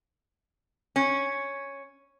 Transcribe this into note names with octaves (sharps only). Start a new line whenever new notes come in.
C#4